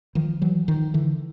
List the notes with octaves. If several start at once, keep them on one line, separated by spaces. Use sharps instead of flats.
D#3 F3
E3 F#3
D#3 F3
D3 E3